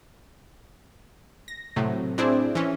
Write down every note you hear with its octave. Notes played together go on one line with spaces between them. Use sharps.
A#6
A2 C3 F#3 A3
C4 D4 E4 G#4 C5 D5
E3 C#4